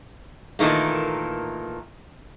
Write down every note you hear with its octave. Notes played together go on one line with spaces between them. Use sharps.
A#2 D#3 E3 A3 A#3